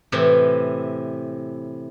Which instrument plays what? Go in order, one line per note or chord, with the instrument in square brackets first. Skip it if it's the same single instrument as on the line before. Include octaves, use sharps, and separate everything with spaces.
[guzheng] A2 C3 E3